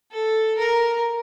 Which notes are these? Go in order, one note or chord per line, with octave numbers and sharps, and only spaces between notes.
A4
A#4